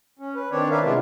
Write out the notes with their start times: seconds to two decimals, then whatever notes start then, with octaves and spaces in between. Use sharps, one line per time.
0.19 C#4
0.35 B4
0.51 D#3 C4 D4 C#5 D5
0.71 A#4 B4 D5 E5 F5
0.83 C3 G#3 B3 D4 E4 F4